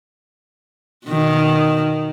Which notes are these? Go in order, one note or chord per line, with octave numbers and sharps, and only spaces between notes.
B2 D#3